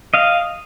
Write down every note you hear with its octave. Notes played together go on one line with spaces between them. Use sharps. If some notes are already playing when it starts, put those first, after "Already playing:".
D#5 F5